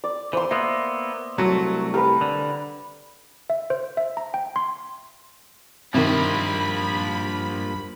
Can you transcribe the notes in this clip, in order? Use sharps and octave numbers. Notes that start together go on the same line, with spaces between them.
D5
E3 C5 C6
A#3 B3 E5
C2 F#3 A3
G3 A#4 B4 B5
D3
E5
C5
E5
A#5
G5
C6
G2 C3 D#3 F3 A#3 B5